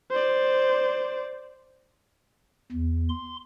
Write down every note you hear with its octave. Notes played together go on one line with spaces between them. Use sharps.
C5 D5
E2
C6